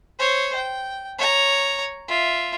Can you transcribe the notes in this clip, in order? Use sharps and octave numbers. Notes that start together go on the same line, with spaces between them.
C5 C#5
G5
C#5 A#5
F4 E5